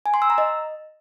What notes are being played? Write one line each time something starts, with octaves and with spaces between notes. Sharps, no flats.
G#5
C6
E6
A#5
D#5